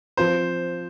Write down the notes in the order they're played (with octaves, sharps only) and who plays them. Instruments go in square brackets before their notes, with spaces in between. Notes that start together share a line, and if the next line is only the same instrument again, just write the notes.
[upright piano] F3 C4 F4 [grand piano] C5